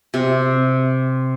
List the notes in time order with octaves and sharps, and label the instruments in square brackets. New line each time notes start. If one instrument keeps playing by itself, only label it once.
[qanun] C3